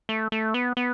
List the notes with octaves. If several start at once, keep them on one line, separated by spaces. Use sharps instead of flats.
A3
A3
B3
B3